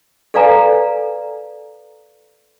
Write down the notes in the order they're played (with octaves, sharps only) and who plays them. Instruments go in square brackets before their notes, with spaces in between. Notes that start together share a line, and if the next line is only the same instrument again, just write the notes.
[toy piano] A4 B4 D5 F5 G#5 A#5